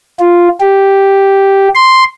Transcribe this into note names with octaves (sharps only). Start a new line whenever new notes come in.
F4
G4
C6